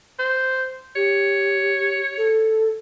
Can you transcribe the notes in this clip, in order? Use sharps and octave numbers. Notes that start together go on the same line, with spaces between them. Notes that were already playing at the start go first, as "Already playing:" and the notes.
C5
G4 C#5
A4